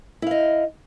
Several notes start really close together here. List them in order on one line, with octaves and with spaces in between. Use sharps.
E4 F5 D#5